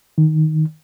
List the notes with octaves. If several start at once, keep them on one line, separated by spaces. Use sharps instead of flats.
D#3